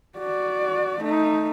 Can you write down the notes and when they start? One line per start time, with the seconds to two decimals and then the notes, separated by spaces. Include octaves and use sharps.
0.18 F#4 D5
1.02 A3 D#4